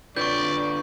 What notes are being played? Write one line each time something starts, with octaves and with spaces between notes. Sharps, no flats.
D4 F4 B4 D5 C#6 G6